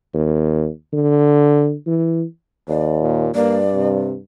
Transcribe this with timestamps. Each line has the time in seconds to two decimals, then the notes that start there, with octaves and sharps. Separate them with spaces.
0.14 D#2
0.93 D3
1.86 E3
2.69 D#2 D5
3.01 A#2
3.35 G2 A#3 D5
3.74 C3